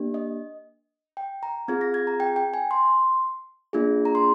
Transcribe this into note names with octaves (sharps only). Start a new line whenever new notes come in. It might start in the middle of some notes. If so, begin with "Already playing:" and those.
Already playing: A#3 D4 G4
D#5
G5
A#5
C4 F4 G#4 G#6
A#6
G#6
A#5
G5
G5
G#5
C6
A#3 D4 F4 G#4
A#5
C6